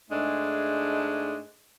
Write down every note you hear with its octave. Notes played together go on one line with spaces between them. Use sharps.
G#2 G#3 A3 D4 D#4